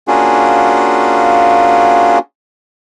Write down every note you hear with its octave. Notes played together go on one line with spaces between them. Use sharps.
A#3 C#4 D4 F4 F#4 G#4